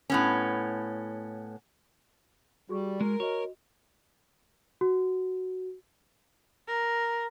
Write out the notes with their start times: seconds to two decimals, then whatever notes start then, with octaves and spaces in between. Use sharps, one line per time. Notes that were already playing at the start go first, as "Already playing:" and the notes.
0.10 A2 B3 C#4
2.69 G3 F#4 G#4 C#6
3.01 G#3 A#4
3.20 F#4 C#5 D#5
4.81 F#4
6.68 A#4